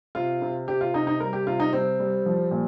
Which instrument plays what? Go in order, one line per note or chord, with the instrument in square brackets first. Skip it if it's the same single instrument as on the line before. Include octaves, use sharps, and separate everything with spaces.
[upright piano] C3 F4
C3
C3 G4
F4
C3 D#4
D#4
G3 A#4
G4
C3 F4
D#4
G3 C4
G3
F3
A#2